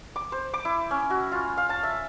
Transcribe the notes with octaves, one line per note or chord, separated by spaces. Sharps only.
D6
C5
D6
E4
C#4
F#4
F4
F5
A5
E5